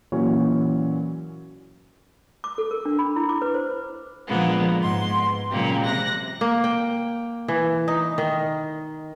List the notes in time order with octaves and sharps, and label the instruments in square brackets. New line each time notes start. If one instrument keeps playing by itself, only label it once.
[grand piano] A#2 E3 F#3 C#4 F#4
[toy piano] D6
A4
A#4
D4
B5
E4
D6
B4
C5
[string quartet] A#2 D3 F3 G#3 A#3 B3
G#2 B3 C6
A#2 C#3 F#3 G#3 A#3 G4
C3 F#6 A#6
[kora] A#3
G5
E3
D#4
D#3